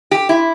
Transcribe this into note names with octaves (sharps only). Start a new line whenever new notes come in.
G4
E4